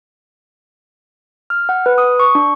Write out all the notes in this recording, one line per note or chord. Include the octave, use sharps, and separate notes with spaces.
F6
F#5
B4
D#6
C#6
D4